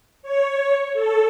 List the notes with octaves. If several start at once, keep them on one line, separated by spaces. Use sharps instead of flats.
C#5
A4